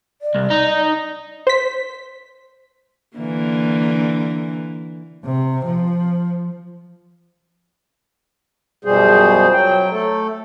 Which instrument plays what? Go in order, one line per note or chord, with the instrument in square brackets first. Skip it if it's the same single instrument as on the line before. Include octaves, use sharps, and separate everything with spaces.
[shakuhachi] D5
[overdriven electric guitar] C2
D#4
[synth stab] C5 B6
[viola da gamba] D3 E3 A#3
[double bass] C3
F3
[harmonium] F#2 B2 F3 G3 G#4 C5
F#3 G5
A3 A4